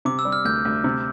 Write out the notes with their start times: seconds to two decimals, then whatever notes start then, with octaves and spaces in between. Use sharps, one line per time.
0.05 C3 D6
0.19 E6
0.25 G3
0.32 F6
0.45 D2 G6
0.65 D2
0.84 C3